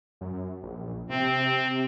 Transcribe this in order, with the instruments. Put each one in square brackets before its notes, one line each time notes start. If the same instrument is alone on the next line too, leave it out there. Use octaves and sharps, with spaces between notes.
[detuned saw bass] F#2
A#1
[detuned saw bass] C3 [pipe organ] C4